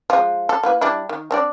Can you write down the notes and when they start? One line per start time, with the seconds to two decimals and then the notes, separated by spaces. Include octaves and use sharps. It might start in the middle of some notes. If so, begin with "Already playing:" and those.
0.10 F3 G#3
0.49 A4
0.63 A#3 E4 B4
0.81 G3 D4 E4
1.09 D#3
1.31 C4 D4 D5